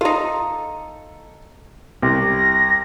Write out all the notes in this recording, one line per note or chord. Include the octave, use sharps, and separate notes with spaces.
D#4 F4 A4
C2 A#6